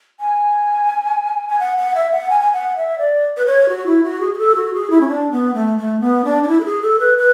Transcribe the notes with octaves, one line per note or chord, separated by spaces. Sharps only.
G#5
G#5
F#5
F#5
E5
F#5
G#5
G#5
F#5
E5
D5
B4
C#5
F#4
E4
F#4
G#4
G#4
A4
F#4
G#4
E4
C#4
D4
B3
A3
A3
B3
D4
D4
E4
A4
G#4
A4
B4
B4